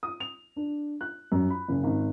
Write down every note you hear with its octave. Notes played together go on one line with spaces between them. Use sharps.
D#6
F7
D4
F#6
F#2
B5
F#1
G#1